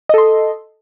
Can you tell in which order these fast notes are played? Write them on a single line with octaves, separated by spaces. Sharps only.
D#5 A4 C6